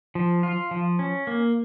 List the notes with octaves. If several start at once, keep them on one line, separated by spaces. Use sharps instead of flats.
F3
F4
F3
C#4
A#3